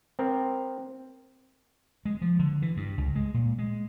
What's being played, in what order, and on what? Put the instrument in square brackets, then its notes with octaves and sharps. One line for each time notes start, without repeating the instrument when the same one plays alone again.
[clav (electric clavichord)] C4 A#4
[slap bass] G#3
F3
D3
E3
G2
C#2
G#3
A#2
G#3